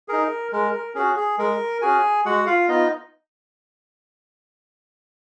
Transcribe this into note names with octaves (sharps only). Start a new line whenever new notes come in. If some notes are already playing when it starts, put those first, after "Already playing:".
D#4 G#4 A#4
G#3 A#4
A#4
C#4 F#4 G#4
G#4
G#3 A#4
C#4 F#4 G#4 G#5
G#3 F#4 F#5
F4 F5
B3 D#4 F4 D#5